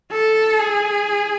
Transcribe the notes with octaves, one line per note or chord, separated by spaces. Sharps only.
A4
G#4